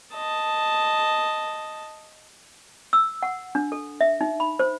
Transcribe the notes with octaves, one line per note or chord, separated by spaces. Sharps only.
D#5 A5
E6
F#5
D4
A4
E5
D#4
B5
C5